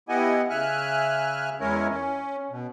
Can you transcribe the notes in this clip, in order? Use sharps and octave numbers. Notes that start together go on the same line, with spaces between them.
B3 E4 G4 D#5 F#5 G#5
C#3 E5 G#5 F6 F#6
E2 G#3 C#4 E4 A#4 C#5
C#4
B2